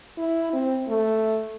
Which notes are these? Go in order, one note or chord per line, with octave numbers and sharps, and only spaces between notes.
E4
C4
A3